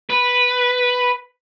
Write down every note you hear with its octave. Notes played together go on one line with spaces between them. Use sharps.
B4